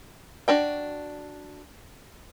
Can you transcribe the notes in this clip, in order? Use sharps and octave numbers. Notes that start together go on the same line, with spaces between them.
D4 F#4 G5